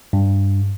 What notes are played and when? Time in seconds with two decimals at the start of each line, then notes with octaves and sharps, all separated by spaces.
0.13 G2